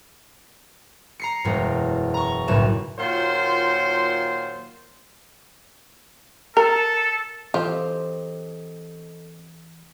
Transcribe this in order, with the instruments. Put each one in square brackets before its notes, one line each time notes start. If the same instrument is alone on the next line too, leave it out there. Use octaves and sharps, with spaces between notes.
[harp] A#5 C7 C#7
E1 F#2
A#5 C#6
F#1 B1 A2 E7
[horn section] A#2 D#3 F#3 F4 C5 C6
[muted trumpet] A4 [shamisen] A#4
[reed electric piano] E3 [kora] C4 G4 [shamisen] F4 [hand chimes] A4 D#5